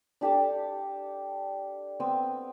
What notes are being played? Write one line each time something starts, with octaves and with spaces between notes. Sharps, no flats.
D4 G4 A4 A5
B3 C4 D#6 E6